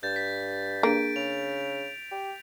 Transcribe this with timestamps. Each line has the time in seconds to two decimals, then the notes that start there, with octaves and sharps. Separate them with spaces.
0.03 G2 G6 A6
0.16 B6
0.83 A#3 D4 G#4 D7
1.16 C#3 F7
2.12 G4